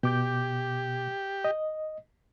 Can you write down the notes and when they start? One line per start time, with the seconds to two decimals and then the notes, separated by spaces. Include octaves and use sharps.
0.03 B2 G4 D6 G6
1.44 D#5